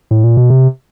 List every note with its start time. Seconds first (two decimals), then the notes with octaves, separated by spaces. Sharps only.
0.11 A2
0.24 A#2
0.37 B2
0.50 C3